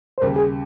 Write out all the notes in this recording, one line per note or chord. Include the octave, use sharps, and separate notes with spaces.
C5
D#2 C#3 G3 A#4
G#4